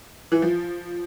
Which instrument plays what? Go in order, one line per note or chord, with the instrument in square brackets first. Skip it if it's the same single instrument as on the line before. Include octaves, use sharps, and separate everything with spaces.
[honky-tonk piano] E3
F3